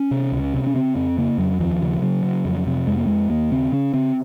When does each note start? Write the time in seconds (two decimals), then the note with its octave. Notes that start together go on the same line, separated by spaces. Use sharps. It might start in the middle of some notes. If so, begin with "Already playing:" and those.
Already playing: C#4
0.11 C3
0.32 C#2
0.54 C3
0.67 C#4
0.75 C#3 C4
0.96 F2 C4
1.18 C#3 A#3
1.38 F2 F#3
1.60 D#2 F3
1.82 C#3
2.02 C#3 F#3
2.24 C#3
2.45 F2
2.67 C3
2.87 F2 G#3
2.97 A#3
3.07 F2 G#3
3.30 D#2 A#3
3.51 C#3 C4
3.72 C#3 C#4
3.94 C#3 C4